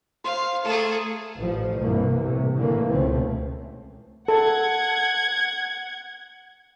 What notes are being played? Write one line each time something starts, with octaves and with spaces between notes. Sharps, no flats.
C5 F5
A3 G#4 A4 A#5
A1 F3
C2 G2 B2 E3 A#3
A2 C3
A2 D3 E3 A#3
C#2 B2 A3 C4 C#4
A4 F#5 G#6